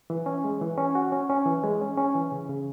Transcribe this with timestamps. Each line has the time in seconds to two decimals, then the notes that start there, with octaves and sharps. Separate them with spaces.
0.10 E3
0.26 C#4
0.44 G#3
0.61 E3
0.78 C#4
0.95 F#4
1.12 C#4
1.30 C#4
1.46 E3
1.64 G#3
1.81 C#4
1.98 C#4
2.15 E3
2.32 C#3
2.49 C#3